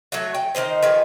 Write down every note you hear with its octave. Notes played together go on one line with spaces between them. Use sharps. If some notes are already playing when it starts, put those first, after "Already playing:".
F#3 A3 F#4 C#5
G5
D#3 G3 D#4 C5
D#3 F3 B3 G#4